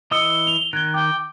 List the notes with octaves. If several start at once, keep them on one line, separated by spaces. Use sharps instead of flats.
E3 D#5 D#6 E6 C#7 G7
F7
D#3 F#6 G#6 G7
G5 D6